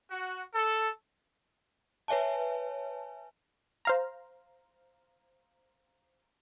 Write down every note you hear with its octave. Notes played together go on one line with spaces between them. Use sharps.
F#4
A4
B4 C#5 E5 G#5 A5
C5 F5 A#5